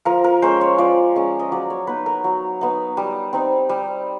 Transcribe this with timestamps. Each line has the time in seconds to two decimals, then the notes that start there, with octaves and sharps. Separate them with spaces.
0.05 F3 A#4
0.24 A#4
0.42 G#3 C#4 C5
0.61 C#5
0.78 F3 D5
1.16 G#3 C#4
1.39 D#5
1.52 F#3 D5
1.70 C#5
1.87 B3 D#4 B4
2.06 A#4
2.24 F#3
2.61 B3 D#4
2.97 G3
3.33 C4 D#4
3.69 G3